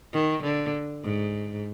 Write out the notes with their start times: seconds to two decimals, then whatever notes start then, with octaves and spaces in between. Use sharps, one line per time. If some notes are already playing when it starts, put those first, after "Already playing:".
0.13 D#3
0.42 D3
1.04 G#2